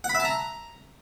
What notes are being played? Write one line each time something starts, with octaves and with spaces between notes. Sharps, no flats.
F#5
B5
E5
A5
A#5